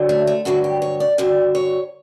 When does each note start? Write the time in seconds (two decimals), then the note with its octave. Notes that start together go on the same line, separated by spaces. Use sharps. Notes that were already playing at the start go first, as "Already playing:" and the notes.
Already playing: G2 D3 F#3
0.09 A3
0.27 A3
0.45 G2 D3 F#3 F#4
0.64 G4
0.82 C#5
1.00 D5
1.18 G2 D3 F#3 D5
1.55 C#5